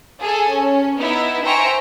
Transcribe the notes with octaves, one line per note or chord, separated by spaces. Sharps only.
G#4 A4 G#5
C#4
B3 D#4 E4 E5
C5 E5 G5 G#5 A#5 C#6